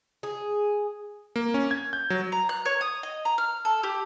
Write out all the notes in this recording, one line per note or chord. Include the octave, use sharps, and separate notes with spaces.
G#4
A#3
C#4
G#6
G6
F#3
A#5
F#6
C#5
D#6
D#5
A#5
F6
A4
G4